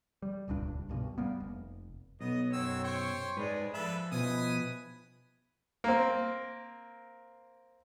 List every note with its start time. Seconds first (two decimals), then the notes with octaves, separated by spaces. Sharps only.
0.22 G3
0.48 D#1 C#2 G2 D4
0.89 C2 G2 B2
1.18 G3 A#3 B3
1.40 F1
2.21 B1 B3 D#5
2.53 F#2 F#3 C4 C#5 E6
2.84 C5 G5 C#6
3.37 G#2 G#3 G#4 B4 D5
3.74 F3 D4 A4 B4 E5
4.12 B2 F3 E4 B4 G#5 D#6
5.84 A#3 C4